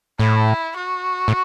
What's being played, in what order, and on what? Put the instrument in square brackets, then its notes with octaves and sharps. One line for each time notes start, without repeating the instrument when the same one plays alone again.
[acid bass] A2 [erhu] E4
[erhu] F#4
[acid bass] A2